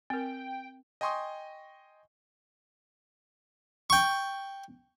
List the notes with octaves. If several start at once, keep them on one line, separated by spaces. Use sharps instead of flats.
C4 A#4 G5
D#5 G5 G#5 C6 C#6 D#6
G5 C#6